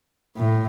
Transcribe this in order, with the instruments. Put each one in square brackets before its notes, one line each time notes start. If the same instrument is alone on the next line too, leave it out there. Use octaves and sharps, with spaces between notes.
[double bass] A2